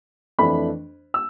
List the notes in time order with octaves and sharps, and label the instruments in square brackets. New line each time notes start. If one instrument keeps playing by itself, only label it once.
[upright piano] F2 E3 A3 D4 B5
E6